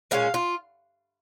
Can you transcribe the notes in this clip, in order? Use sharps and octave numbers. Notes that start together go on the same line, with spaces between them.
A#2 G#3 C#4 F5
F4